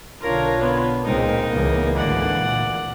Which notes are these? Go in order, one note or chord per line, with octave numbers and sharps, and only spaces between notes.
B1 D3 D4 F4 A#4 C#5 A#5
B3
C#2 A#2 G#3 C4 D#4 A#4
C#2 E3 A#3 B3
G#1 D2 D3 D5 F#5
A#2